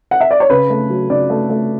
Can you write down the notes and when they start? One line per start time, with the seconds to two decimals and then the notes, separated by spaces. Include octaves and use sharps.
0.11 F#5
0.21 E5
0.31 D5
0.40 C#5
0.50 C#3 B4
0.70 A3
0.90 F#3
1.10 C#3 D5
1.30 A3
1.50 A3